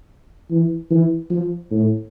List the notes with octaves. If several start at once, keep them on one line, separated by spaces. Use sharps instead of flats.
E3
E3
F3
A2